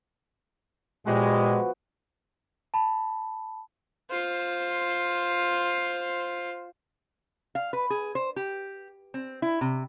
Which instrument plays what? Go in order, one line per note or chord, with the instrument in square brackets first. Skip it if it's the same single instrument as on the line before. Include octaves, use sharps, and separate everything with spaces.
[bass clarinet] A#2 [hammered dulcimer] F3 B3 F#4 [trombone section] G#3 [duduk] G4
[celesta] A5 B5
[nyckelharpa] F4 C5
[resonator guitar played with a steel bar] F5
B4
G#4
C5
G4
C4
E4
C3